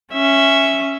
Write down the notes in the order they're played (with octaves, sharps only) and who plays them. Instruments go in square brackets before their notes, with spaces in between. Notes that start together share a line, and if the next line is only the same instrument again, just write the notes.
[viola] C#4 E5